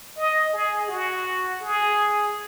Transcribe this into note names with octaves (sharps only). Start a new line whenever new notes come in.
D#5
G#4
F#4
G#4